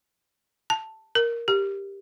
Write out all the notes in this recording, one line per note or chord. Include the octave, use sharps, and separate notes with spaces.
A5
A#4
G4